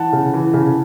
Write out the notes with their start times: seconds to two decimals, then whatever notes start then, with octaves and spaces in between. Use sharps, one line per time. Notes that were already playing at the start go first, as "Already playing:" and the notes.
Already playing: E3 F#5 A5
0.13 C#3
0.34 E3
0.54 C#3